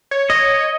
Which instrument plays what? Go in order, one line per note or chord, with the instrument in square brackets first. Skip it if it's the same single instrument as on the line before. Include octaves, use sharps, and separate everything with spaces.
[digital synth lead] C#5
[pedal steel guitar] D#5